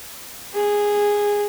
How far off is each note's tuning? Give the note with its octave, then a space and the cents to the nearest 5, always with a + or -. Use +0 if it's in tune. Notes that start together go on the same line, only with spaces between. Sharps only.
G#4 -10